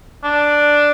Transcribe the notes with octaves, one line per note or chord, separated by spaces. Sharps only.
D4